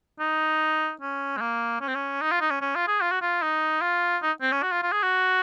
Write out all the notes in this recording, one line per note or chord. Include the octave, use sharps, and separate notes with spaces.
D#4
C#4
G#3
A#3
C#4
C4
C#4
D#4
F4
D#4
C#4
C#4
F4
G#4
F4
F#4
F4
D#4
F4
D#4
C4
C#4
F#4
F4
F4
G#4
F#4